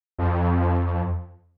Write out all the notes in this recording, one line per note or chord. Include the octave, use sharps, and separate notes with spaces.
F2